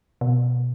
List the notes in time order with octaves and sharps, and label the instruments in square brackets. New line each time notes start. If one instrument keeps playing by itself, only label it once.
[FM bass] B2